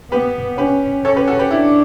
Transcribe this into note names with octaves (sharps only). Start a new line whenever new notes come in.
B3 G4 B4
C#4 G4 B4
C#4 A4 C#5
G4 B4
F#4 A4
G4 B4
D4 E4 G4